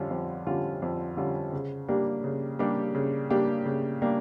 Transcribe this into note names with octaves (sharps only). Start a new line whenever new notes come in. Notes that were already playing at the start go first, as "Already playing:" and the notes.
Already playing: F2 D3 G3 C#4 F4
F2
D3 G3 C#4 F4
F2
D3 G3 C#4 F4
C#3
G3 A#3 D4 G4
C#3
G3 A#3 D4 G4
C#3
G3 A#3 D4 G4
C#3
G3 A#3 D4 G4